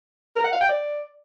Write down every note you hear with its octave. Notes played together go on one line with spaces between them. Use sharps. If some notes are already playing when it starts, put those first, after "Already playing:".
A#4
F#5
F5
G5
D5